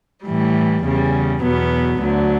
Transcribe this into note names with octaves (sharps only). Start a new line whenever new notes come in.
A2 E3 G3
E2 C#3 G3
E2 B2 F#3 B3
D2 D3 F#3